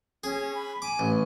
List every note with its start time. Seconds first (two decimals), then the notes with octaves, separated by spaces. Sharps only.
0.24 C#4 G#4
0.55 B5
0.82 G#5 D6
0.99 A1